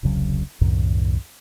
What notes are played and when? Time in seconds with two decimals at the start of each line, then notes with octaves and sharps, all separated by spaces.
0.03 E1 C2 C#3 F#3
0.61 C2 F#2 A2 D#3